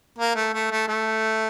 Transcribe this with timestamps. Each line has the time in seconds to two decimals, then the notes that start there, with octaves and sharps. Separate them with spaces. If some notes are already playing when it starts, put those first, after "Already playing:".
0.18 A#3
0.36 A3
0.54 A3
0.71 A3
0.88 A3